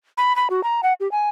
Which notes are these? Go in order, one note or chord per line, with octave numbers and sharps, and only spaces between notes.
B5
B5
F#4
A#5
F#5
G4
G#5